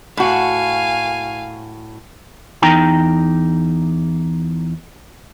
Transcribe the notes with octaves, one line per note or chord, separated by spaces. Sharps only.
A2 F#4 F5 G#5
E2 D#4 G5 A#5